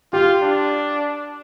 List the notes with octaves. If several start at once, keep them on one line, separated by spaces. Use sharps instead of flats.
F4 G4
D4